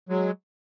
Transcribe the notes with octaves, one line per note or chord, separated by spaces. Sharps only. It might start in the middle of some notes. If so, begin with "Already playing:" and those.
F#3 G#3